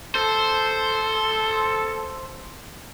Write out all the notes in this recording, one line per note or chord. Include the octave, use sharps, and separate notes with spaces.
A4 C5